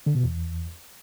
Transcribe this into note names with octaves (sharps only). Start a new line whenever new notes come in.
D3
B2
E2